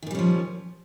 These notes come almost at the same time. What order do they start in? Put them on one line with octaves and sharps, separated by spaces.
D#3 A#2 G3 C#4 F3